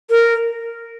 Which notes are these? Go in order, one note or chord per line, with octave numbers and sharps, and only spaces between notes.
A#4